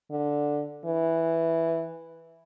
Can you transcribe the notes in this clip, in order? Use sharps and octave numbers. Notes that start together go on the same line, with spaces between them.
D3
E3